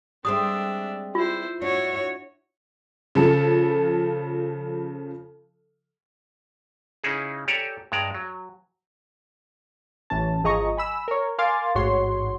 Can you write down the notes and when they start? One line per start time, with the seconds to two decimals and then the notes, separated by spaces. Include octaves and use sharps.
0.25 G3 G#3 C4 D4 E5 D#6
1.15 E4 F4 C5
1.62 D4 E4 F#4 C#5
3.15 C#3 F3 A4
7.04 C#3 C#4 D#4 E4 G#4
7.48 G4 A4 C#5 D5 G#5 A#5
7.92 G2 G#3 D5 A#5
8.15 F#3
10.10 A1 E3 C#4 A5
10.43 G#1 F3 G#4 D#5 A#5 C#6
10.77 G#5 B5 E6
11.08 A#4 C#5
11.38 A#4 F5 G#5 C6 D6 A6
11.75 A1 G#2 F#4 C#5 C6